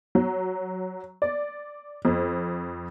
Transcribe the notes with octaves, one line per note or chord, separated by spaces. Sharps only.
F#3
D5
F2